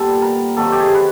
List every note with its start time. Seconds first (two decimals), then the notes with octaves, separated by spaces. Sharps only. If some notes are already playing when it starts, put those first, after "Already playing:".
Already playing: A#2 G3 B3 A4
0.22 A#4
0.57 C3 D#3 F#3 A#3 A4
0.72 G4
0.80 G#4
0.95 B4